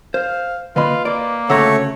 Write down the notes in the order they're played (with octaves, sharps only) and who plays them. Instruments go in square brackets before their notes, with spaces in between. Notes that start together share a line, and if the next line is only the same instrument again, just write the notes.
[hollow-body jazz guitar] C5 [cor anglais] F5
[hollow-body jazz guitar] D3 A#3 [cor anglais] F4 [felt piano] B4 D#5 B5
[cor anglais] A#3 [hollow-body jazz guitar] D5
[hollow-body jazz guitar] D2 C#3 A#5 [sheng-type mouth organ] A3 C#5 [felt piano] F#5 E6